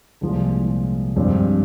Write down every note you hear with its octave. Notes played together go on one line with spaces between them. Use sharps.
C2 A#2 F3 G#3
G2 F3 G#3 C4